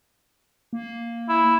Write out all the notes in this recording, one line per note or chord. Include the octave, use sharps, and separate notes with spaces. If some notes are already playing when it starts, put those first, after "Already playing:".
A#3
E4